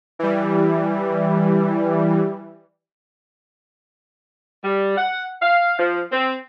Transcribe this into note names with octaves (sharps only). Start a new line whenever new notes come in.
E3 G3
G3
F#5
F5
F3
C4